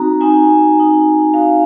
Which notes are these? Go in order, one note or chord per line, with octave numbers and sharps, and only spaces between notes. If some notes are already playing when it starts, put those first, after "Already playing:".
Already playing: C4 D#4 F#4 A#5
C4 D#4 F#4 G#5
C4 D#4 F#4
C4 D#4 F#4 F5